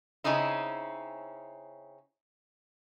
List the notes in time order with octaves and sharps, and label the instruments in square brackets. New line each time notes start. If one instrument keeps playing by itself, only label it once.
[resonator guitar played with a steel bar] C#3 C4 C#4 D#4 E4